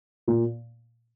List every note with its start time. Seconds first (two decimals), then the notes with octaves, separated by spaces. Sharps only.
0.28 A#2